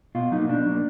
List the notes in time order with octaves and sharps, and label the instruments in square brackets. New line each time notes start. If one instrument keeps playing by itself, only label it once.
[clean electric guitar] B2 F4
F#3 A#3 D#4
B2 D4
F#3 A#3